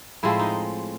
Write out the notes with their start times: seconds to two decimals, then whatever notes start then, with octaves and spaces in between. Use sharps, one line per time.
0.23 A2 F3 G#3 C4 E4
0.39 D#4